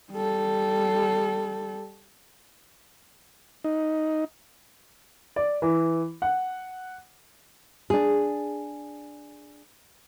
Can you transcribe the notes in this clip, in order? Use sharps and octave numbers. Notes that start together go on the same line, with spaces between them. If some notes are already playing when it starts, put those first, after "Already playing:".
G3 A4
D#4
D5
E3
F#5
D4 G#4